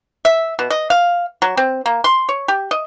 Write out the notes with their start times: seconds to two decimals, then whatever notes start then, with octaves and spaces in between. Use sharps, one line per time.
0.25 E5
0.59 B2
0.70 D#5
0.90 F5
1.42 F#3
1.57 C4
1.86 A#3
2.04 C6
2.29 C#5
2.48 G4
2.71 D#5